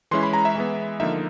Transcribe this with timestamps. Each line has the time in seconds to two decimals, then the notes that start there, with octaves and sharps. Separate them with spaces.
0.11 E3 G#3 C#4 E4 C6
0.23 B5
0.33 A#5
0.45 E5
0.55 E3 G#3 B3
1.00 D3 F3 A#3 D#4 E5